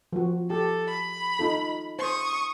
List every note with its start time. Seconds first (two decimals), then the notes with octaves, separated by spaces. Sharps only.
0.12 F3 F#4
0.50 G4 A4
0.90 B5
1.39 D#4 F4 A4
1.99 C5 C#6 D#6